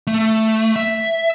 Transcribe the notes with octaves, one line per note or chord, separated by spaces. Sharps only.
A3
E5